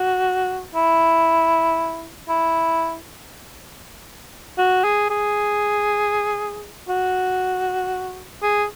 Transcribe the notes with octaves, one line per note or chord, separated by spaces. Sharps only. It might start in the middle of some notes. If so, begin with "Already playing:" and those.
Already playing: F#4
E4
E4
F#4
G#4
G#4
F#4
G#4